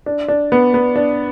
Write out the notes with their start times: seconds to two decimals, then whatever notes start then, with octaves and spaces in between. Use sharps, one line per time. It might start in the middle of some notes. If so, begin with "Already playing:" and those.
0.06 D4
0.28 D4
0.52 B3
0.74 B3
0.96 D4